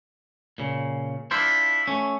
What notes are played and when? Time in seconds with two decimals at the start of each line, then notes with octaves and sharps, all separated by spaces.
0.58 A#2 C#3
1.31 D4 E4 F4 C5
1.88 A3 C#4